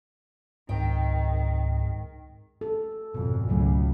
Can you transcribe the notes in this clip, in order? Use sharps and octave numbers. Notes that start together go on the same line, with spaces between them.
C#2 G#2 D#3 C4 D#5 G5
A4
G#1 F2 B2
C#2 C#3 F#3 A3